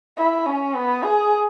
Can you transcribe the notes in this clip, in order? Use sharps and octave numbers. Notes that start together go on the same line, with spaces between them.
E4
C#4
B3
G#4